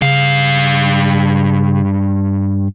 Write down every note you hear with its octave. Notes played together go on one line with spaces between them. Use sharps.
G2 C#3 F5